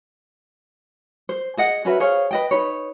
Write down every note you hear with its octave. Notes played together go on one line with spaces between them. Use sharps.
C5
G#4 D#5 F#5
C#4 F#4 B4 E5
G#4 C5 C#5 F5
B4 D#5 G5
D#4 B4 C#5